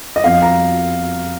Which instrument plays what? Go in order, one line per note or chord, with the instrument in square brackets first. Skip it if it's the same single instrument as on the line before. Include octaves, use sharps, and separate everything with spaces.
[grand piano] D#5
F2 F5
A#5